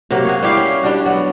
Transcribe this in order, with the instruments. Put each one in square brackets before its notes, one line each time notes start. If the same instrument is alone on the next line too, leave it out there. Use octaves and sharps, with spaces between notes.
[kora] C3 F#3 A#3
F#4 G#4 C#5
G3 E4 G4 F5
C#4
G3 D4 F#4
F#3 B3